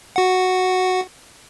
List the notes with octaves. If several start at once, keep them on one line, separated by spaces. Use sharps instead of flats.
F#4 F#5